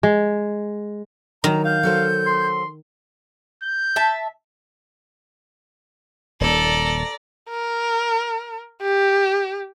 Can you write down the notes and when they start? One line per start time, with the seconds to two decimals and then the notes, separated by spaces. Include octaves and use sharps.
0.03 G#3
1.44 D#3 F#3 A#5
1.65 F5 G6
1.83 F#3 A4 C5
2.26 C6
3.63 G6
3.96 E5 A5
6.41 D#1 A#2 A4 D5 A#5
7.50 A#4
8.81 G4